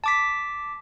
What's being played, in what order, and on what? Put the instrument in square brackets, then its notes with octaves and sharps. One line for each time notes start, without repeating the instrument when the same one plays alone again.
[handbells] A5 D6 B6